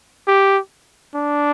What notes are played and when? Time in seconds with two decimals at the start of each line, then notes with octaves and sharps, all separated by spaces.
0.28 G4
1.15 D4